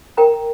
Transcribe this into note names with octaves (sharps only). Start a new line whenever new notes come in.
A#4 G5 A#5